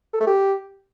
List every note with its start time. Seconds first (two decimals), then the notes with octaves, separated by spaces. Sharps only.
0.14 A4
0.20 A3
0.27 G4